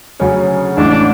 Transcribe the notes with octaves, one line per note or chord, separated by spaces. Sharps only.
D2 C#3 F#3 C#4 G#4
A1 A2 G#3 D4